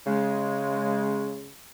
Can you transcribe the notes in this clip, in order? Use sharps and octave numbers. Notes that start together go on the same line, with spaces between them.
C#3 G#3